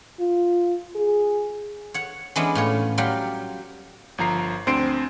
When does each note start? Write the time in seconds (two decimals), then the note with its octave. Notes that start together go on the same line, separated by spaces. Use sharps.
0.20 F4
0.95 G#4
1.94 C#5 F#5
2.36 E3 G#3 B3 C#4 D4
2.55 A2 F4 C#5
2.98 F#3 G3 F4 G4 A#4 F#5
4.18 G1 F3 A#5 C7
4.67 D2 C4 D4 C6 C7 D7